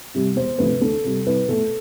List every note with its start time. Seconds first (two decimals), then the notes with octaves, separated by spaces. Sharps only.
0.15 C3 G3
0.36 E1 C5
0.59 D2 C3 F3 A3 B4
0.81 D2 A4
1.04 C3 G3
1.26 C2 B4
1.48 B2 A3 A4